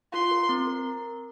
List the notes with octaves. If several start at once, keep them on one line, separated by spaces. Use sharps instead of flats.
F4 C6
A#4
C4
A#4